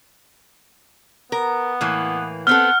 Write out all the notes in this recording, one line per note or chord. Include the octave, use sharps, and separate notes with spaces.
B3 A#4
A2 E3 A#3
B3 C4 A4 F#5 F6